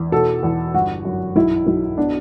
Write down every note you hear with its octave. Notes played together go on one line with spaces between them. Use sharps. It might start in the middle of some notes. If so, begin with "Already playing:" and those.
Already playing: E2
B2 A4
E2
G1 F#4
F#2
B1 E4
B1
B3 D4